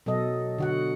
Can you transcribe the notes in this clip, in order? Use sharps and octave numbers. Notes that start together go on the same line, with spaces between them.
B2 F#3 A4 D#5
D3 F#4 F#5